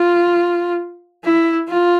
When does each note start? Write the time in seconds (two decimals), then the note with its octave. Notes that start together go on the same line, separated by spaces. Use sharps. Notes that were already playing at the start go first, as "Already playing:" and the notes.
Already playing: F4
1.24 E4
1.69 F4